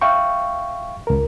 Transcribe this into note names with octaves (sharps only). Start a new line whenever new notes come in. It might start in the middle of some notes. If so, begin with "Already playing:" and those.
E5 F5 G5 C#6
C#2 A#4